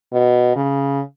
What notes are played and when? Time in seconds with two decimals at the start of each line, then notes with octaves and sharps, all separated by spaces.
0.13 B2
0.56 C#3